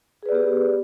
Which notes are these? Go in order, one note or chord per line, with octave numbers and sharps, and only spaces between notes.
B3 G4 G#4 B4 D5